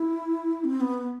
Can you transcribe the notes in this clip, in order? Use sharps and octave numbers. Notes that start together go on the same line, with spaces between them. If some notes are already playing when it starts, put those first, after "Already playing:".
Already playing: E4
C4
B3